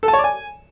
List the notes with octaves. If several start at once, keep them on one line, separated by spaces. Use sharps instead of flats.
A4
A5
C#5
D5
G#5